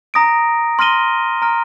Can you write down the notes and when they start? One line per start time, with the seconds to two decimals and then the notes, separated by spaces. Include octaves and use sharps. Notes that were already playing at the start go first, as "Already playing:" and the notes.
0.14 A#5 D#6 A#6 D7
0.79 C6 F6 A#6 D#7 G7
1.42 A#5 F6 A#6 D7